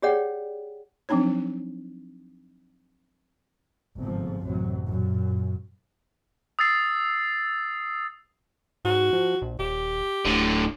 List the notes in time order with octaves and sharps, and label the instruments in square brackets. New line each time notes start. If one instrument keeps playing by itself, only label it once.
[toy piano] G4 G#4 C#5 D5 F#5 G5
[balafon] F3 F#3 C4 D4 D#4 C#5
[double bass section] G1 G#2 C3 F3
A1 F#2 C3 F#3
F#2 A#2
[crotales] D#6 E6 A6 C7
[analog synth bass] G#2 [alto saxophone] F#4
[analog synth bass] F3
A#1
[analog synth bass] D#1 [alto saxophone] G4
[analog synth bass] D1 [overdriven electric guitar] A2 D3